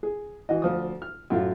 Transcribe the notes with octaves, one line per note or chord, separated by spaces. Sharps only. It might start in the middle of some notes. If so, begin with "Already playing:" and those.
G#4
E3 F#4 D#5
D2 F3 D#6
F6
F#2 A2 F4